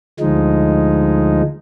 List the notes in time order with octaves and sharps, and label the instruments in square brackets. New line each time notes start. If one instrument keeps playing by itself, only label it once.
[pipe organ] D2 F3 G#3 D#4